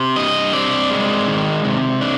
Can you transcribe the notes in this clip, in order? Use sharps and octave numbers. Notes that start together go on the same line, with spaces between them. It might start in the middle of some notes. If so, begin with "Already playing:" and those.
Already playing: C3
G2 D#5
C4 D5
G#3
D#3
C3
D4